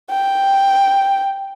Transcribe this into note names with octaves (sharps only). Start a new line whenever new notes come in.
G5